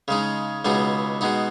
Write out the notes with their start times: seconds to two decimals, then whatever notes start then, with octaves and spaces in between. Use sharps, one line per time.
0.08 C#3 G#3 D#4
0.65 C#2 B2 G#3 B3 D#4
1.21 B2 G#3 B3 D#4